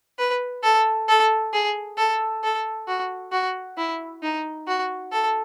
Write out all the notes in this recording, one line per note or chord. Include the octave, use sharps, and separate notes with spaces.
B4
A4
A4
G#4
A4
A4
F#4
F#4
E4
D#4
F#4
A4